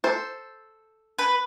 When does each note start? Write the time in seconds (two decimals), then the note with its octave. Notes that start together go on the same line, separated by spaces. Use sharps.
0.04 A4 C5
1.19 B4